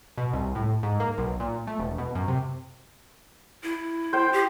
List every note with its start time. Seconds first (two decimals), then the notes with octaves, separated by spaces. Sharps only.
0.18 B2
0.33 C2
0.55 A2
0.83 G#2
1.00 A#3
1.18 B1
1.40 A#2
1.67 A3
1.79 E1
1.98 B2
2.15 F#2
2.28 C3
3.63 E4
4.13 C5 G5
4.33 G4